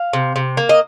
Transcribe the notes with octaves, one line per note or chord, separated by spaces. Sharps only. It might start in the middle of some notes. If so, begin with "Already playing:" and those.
Already playing: F5
C3
C3
A#3
D#5